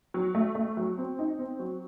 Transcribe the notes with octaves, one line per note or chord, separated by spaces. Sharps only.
F#3
A3
A3
F#3
C4
D#4
C4
F#3